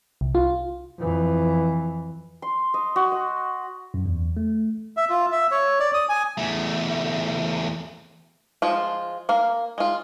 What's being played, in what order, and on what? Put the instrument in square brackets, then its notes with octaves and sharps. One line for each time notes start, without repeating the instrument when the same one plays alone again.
[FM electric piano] C2
F4
[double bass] F2 E3
[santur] C6
D#5
F#4
D#5
[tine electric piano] F#2
E2
A3
[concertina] E5
F4
E5
C#5
D5
D#6
G#5
[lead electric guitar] E2 A3
[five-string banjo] F3 G#3 F4
A#3 F5
G#3 F4